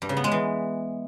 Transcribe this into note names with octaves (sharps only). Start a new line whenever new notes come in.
G2
C#3
B3
G#3
E3